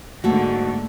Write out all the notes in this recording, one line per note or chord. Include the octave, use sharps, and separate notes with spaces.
G#2 D3 A3 A#3 F#4